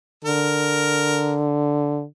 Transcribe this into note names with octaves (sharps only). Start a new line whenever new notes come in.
D3 A#4